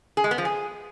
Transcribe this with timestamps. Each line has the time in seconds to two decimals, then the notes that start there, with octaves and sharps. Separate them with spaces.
0.17 G#4
0.24 G#3
0.31 B3
0.38 F3
0.45 G#4